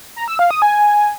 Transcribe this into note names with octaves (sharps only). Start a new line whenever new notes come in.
A#5
E6
F5
D#6
G#5